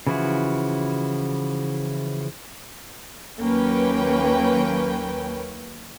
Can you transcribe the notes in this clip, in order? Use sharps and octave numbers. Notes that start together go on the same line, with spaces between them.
C#3 E3 F3 E4 F#4
D#2 F#3 A#3 C#4 B4 G5